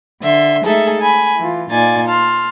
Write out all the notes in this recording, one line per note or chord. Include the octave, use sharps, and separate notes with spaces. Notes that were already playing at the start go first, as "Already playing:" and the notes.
D3 E5 C6
G#3 A3 D#4 G#4 A4 E5
G#5 B5
E3 F4
A#2 D#4 F4 D5 G#5 A6
A5 C6 F6